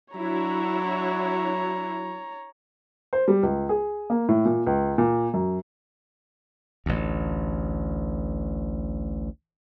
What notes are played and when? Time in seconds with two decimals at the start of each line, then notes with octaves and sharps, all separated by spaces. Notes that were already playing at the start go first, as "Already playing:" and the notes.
0.14 F#3 D4 E4 F#4 C#5 A#5
3.13 C5
3.28 G3
3.43 C#2
3.69 G#4
4.10 A#3
4.29 A2
4.45 A#2
4.67 C#2
4.98 A#2
5.34 F#2
6.86 A1 D2